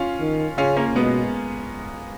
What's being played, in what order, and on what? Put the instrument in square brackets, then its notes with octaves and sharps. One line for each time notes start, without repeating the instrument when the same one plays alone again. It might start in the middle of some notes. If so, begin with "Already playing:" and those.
Already playing: [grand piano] C#4 F4
[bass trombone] D#3
[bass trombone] C#3 [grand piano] C#4 F4
[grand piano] A#3 C#4
[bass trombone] B2 [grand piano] G#3 B3